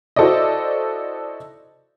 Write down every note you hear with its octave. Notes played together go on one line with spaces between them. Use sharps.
E4 F#4 A4 C5 D5 D#5